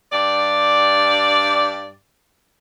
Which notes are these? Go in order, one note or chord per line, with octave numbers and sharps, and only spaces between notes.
G2 G4 D5